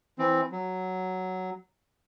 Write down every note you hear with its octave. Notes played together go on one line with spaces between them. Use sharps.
E3 C4
F#3